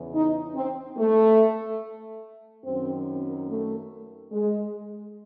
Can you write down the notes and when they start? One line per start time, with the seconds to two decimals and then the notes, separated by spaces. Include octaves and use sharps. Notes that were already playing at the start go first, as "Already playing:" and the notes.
Already playing: E2 C#3 E3
0.14 D#4
0.55 C4
0.98 A3
2.64 F#2 D#3 C4
3.49 A3
4.32 G#3